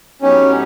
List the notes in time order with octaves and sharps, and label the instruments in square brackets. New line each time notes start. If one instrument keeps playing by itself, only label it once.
[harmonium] A2 F#3 B3 D#4 G4 [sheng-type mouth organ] C#4